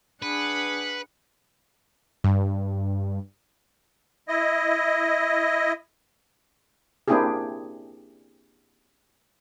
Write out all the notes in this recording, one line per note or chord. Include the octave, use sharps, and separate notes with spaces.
D4 G#4 B4 F#5
G2
E4 D#5
A#3 C4 D4 E4 G4 G#4